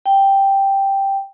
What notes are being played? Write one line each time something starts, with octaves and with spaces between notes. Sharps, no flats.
G5